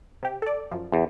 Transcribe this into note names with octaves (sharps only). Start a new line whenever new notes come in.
C3 G4
A4 D5
F#2 F3
E2